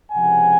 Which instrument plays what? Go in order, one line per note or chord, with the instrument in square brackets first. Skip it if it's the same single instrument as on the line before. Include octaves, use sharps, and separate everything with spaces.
[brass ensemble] C#2 C3 F3 F#5 G#5